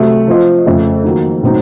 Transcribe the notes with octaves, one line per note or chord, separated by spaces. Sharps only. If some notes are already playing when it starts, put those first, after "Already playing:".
Already playing: C3 F#3 A3
F3 C4 F4 C5 D#5
F2 C#3 A3
D#3 F#3 A#3
A2 F#3 C4 D#4